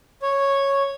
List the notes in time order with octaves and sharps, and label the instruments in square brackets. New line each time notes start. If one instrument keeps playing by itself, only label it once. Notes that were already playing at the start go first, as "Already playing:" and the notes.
[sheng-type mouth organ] C#5